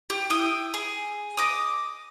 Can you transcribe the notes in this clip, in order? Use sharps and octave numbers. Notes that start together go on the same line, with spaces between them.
G4
E4 G5 D#6
G#4
D#5 D6 D#6